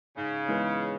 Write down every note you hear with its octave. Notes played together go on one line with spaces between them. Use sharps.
G#2 C#3
E3 G#3 B3